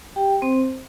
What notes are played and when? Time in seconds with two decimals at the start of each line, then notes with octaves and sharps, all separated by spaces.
0.16 G4 G5
0.42 C4 C5